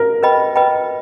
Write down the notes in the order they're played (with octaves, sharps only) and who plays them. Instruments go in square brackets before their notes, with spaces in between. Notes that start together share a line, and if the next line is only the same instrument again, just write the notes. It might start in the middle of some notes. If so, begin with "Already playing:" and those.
Already playing: [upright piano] A#4
[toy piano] B4 D#5 G5 B5
B4 D#5 G5 B5